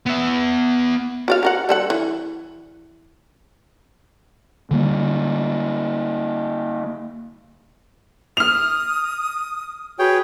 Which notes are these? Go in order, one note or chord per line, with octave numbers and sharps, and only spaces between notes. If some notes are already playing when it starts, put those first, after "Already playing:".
B3 E5
F#4 D5 F5
F#4 A#4 F#5
G3 A4 F#5
E3
D3 G3 A#3
D#6 F6 F7
F#4 G#4 B4 C#5 G5